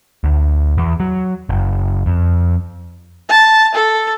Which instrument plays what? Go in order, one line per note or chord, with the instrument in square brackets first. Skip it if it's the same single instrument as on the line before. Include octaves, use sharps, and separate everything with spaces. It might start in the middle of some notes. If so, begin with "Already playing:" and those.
[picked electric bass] D2
E2
F#3
F#1
F2
[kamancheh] A5
A4